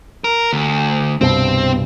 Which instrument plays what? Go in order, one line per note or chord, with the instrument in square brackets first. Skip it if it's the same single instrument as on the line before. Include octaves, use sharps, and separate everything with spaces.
[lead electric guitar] A#4
D2
[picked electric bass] C2 G2 B2 [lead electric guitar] C4